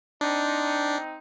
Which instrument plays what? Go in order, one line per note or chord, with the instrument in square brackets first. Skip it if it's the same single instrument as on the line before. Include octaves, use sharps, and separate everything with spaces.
[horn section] C4 D#4 [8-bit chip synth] D4